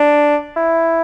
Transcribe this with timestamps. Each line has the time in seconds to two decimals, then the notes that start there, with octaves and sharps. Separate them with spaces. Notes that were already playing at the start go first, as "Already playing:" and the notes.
Already playing: D4
0.56 E4